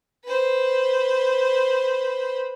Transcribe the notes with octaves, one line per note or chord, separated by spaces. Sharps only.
B4 C5